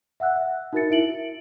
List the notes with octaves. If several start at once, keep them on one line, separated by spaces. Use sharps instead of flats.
E5 F#5 E6 F#6
E5
D#4 F#4 A#4 E5 A6 C#7
E4 E5 D7 F#7